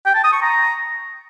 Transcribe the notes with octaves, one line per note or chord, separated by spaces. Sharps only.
G5
A5
D#6
C#6
A#5